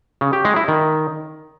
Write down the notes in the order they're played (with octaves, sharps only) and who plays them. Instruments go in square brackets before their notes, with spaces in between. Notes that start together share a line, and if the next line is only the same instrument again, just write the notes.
[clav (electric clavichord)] C#3
G4
G#3
E4
D#3